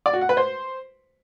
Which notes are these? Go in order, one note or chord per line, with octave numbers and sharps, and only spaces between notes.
D5
F#4
F#5
B4
C5